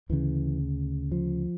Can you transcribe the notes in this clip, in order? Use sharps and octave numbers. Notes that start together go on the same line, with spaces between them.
D2 C#3 E3
F3